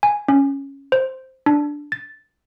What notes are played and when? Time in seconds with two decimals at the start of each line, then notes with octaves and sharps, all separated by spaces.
0.03 G#5
0.28 C#4
0.92 C5
1.46 D4
1.92 A6